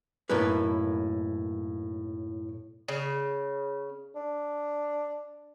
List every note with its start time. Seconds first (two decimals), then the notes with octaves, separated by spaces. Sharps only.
0.29 B1 F#2 A2 A#3 B4
2.88 C#3
4.15 D4